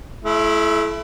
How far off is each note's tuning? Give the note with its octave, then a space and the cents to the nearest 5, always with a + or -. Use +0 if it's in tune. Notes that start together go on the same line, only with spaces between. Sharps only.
A3 -35 E4 +15